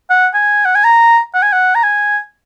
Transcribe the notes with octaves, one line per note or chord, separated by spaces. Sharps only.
F#5
G#5
F#5
G#5
A#5
F#5
G#5
F#5
A#5
G#5